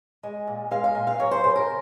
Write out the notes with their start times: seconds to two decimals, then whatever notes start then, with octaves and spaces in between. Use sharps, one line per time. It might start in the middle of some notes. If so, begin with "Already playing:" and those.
0.23 G#3
0.47 A#2
0.71 G#3 F5
0.84 F5
0.95 A#2
1.07 F5
1.19 F#3 C#5
1.31 C5
1.44 C#3 C5
1.56 A#4